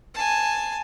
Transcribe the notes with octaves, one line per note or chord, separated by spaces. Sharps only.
G#5 A5